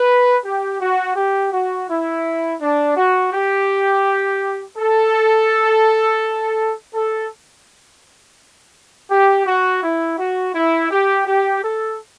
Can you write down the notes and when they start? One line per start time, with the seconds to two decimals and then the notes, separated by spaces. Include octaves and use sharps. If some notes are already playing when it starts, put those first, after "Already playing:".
Already playing: B4
0.45 G4
0.80 F#4
1.16 G4
1.53 F#4
1.90 E4
2.61 D4
2.97 F#4
3.33 G4
4.77 A4
6.94 A4
9.11 G4
9.47 F#4
9.83 E4
10.19 F#4
10.55 E4
10.91 G4
11.27 G4
11.64 A4